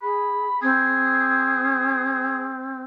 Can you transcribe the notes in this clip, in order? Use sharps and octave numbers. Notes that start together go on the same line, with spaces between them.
G#4 B5
C4 G#4